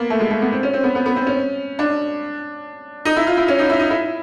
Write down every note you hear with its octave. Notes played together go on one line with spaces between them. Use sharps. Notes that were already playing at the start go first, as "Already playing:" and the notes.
Already playing: A#3 B3
A3
G#3
A3
B3
C4
C#4
C4
B3
B3
B3
C4
C#4
D4
D#4
E4
F4
E4
C#4
D#4
E4
D#4
E4